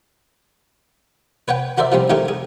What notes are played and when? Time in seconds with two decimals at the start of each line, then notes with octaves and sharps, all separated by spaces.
1.48 B4 C#5 F#5 G5
1.78 F#4 A#4 C5 D5 E5
1.92 F3 G3 C4 C#4
2.10 D#3 A3 G4 A#4 C#5
2.28 G#4